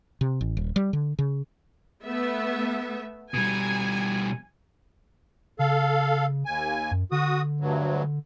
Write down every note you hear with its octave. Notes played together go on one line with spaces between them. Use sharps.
C3
A1
D#1
G3
D3
C#3
A3 B3 E5
B2 G3 G#5
C#3 A4 F5
D#2 G#5
F#2
D3 F#4 D#6
D2 G2 F#3